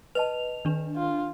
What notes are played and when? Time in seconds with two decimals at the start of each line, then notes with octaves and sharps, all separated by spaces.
0.15 B4 D#5 A5 F7
0.65 D#3 D4
0.96 F4